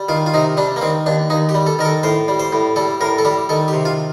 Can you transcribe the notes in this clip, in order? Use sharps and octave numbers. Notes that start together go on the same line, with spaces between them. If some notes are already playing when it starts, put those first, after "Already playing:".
Already playing: G3
D#3 F4
F4
C3 D#4
G3 D4
A#3
D#3 C4
D#2 D4
D#2 D#4
G4
G3
A4
D#3 A#4
A4
A2 C5
G3
C5
A2
G3 A4
A2 A#4
A4
G3 G4
D#3 A4
G4
C3
F4